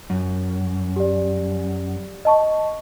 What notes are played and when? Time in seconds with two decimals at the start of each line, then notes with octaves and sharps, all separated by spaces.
0.10 F#2
0.96 G4 D5
2.25 D#5 A5 C#6